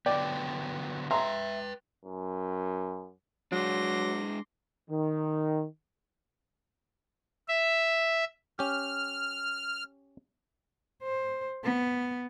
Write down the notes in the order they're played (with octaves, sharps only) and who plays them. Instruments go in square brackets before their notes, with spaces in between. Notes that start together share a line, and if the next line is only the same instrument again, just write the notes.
[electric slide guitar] D3 F#3 B3 [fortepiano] D5 [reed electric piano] G5
[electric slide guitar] B4 G5 [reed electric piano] E5 [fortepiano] A#5 C6
[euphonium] F#2
[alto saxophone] F#3 [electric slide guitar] G#3 D4 [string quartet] C6 D6 A#6
[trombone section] D#3
[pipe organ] E5
[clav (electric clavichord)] C#4 G4 [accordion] F6
[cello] C5
B3